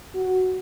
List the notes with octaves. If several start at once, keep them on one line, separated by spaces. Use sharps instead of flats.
F#4